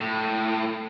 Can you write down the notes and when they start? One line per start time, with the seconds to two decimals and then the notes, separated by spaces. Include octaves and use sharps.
0.01 A2